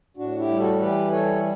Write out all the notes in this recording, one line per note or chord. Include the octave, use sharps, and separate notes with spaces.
A2 D4 F#4
E4 G4
G3
F#4 A4
E3 G4 B4
G3 A4 C#5